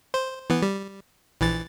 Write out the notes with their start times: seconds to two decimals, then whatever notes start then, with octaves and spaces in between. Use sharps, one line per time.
0.14 C5
0.50 E3 B3
0.62 G3
1.41 A#1 E3 A6